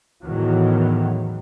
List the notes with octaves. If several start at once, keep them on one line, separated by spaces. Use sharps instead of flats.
E2 A2 D#3 E3 F#3